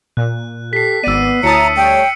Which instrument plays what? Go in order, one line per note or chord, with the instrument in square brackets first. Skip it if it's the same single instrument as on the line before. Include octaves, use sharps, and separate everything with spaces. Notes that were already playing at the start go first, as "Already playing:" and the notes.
[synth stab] A#2 [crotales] F#6
[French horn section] G4 A4 [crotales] B6 C7
[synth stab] G#1 D5 [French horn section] B3 [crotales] E6 D#7
[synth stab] D2 A5 D#6 [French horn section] E4 C#5 [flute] A#5 [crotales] C#7
[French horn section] G3 A3 C#5 [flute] G5